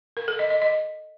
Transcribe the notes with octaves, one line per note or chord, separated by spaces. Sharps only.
A#4
A4
D#5
D#5
D#5